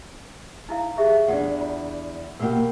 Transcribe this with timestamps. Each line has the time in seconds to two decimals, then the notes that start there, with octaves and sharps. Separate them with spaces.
0.69 D#4 E4 F5
0.97 G4 G#4 E5
1.28 E2 D4 D5 F#5
1.61 F4
2.39 B2 A#3 G4 A#4 F#5